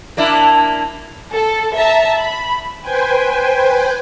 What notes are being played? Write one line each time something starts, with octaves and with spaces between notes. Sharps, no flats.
A#3 D4 E4
A4
E5 A5 A#5
B5
B4 C5 G5 G#5